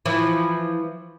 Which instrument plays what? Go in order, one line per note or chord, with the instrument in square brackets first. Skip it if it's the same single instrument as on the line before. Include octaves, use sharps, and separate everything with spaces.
[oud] E3 F3